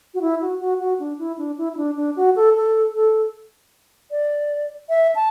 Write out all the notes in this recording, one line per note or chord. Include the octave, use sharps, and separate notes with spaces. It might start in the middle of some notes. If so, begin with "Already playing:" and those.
F#4
E4
F#4
F#4
F#4
D4
E4
D4
E4
E4
D4
D4
F#4
A4
A4
A4
D5
E5
A5